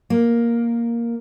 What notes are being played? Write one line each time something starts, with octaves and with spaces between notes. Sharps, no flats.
A#3